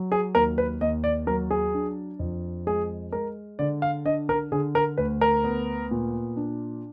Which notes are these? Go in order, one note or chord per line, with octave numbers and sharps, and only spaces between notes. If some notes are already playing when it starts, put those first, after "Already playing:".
Already playing: F#3
G#4
D#2 A#4
B4
D#2 D#5
D5
F#3 A#4
G#4
D4
F2
G#3 G#4
G#3 A#4
D3 D5
F5
D4 D#5
A#4
D3 G#4
A#4
D2 B4
A#4
B3
A#2
D4